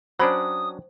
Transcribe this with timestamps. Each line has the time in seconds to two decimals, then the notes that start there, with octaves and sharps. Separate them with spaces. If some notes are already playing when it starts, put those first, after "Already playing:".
0.20 F#3 C#4 D4 C5 G5 B5 D#6